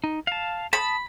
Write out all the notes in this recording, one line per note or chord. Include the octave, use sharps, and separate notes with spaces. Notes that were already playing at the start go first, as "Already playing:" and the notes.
D#4
F5 A5
A5 B5 D#6